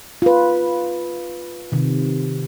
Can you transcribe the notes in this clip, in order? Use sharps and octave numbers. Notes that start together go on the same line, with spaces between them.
F4 B4
C3 D#3